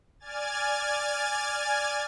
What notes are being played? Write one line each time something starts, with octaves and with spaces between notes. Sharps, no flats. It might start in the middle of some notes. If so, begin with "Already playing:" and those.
D5 G#5 F6 G#6 A6